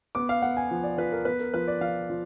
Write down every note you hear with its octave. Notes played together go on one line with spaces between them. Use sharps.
B3 D6
F5
B3 F#5
G#5
F3
D5
F3 B4
A#4
B3 B4
A#4
F3 B4
D5
F3 F5
F3